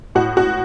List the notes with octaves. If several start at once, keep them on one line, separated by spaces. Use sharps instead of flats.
A2 F#4
F#4